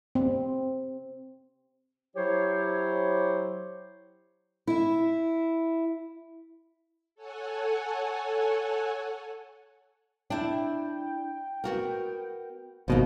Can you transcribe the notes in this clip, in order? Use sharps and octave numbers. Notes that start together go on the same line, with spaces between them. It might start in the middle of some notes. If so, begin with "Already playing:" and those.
C4
F#3 E4 G4 C5 C#5
E4 E5
A4 C#5 F#5 G#5
D4 E4 G5
B3 F#4 A#4
G#1 B2 F3 A#3 D#4